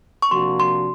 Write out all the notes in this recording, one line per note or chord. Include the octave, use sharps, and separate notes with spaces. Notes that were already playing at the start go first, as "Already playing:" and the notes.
C#6
C3 F3 A#3 D4 F#4 C6
C6